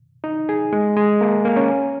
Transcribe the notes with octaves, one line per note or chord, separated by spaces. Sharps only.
D#4
G#4
G#3
G#3
A#3
A#3
C#4